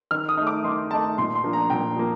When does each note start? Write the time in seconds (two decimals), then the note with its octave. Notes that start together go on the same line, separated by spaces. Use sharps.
0.11 D#3 F6
0.29 D#6
0.37 A3 D#4
0.47 D6
0.64 D#3 C6
0.91 A3 D#4 A5
1.18 A#2 C6
1.35 C6
1.44 F3 A#3 D4
1.53 A#5
1.70 A#2 G5
1.96 F3 A#3